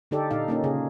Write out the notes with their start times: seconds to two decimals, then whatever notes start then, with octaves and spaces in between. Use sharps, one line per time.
0.11 D3 D#4 G4 A4 D5
0.31 A#2 D#4 F5
0.48 A#3 C#4 D#4
0.64 C#3 G#4